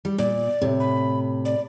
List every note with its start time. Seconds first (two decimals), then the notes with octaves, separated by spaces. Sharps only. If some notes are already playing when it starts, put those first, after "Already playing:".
0.05 G3
0.18 A#2 D5
0.61 A2 C3
0.80 B5
1.45 D5